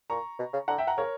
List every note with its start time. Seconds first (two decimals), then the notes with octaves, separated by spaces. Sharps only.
0.09 A#2 A#5 C#6
0.39 B2
0.53 C#3
0.68 D3 F#5 A#5
0.78 E5 G5
0.87 F#5 A#5
0.97 C#3 A#4 C#5